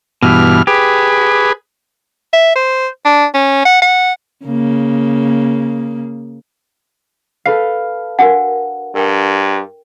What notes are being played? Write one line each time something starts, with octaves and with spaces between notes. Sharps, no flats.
G2 B2 E3 F6
G4 G#4 B4
E5
C5
D4
C#4
F#5
F#5
C#3 A#3
A4 B4 F5 C7
D4 F#4 A#4 F#5
G2 A#4 G5